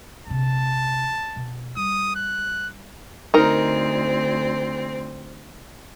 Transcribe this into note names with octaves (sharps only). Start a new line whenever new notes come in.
A#1 C3 A5
B2
G3 D#6
F#6
D2 C4 D#4 A#4